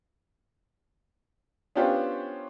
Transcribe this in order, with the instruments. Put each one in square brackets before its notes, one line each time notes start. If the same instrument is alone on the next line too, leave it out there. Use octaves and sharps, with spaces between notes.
[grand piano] B3 C#4 D4 F4 G4 C5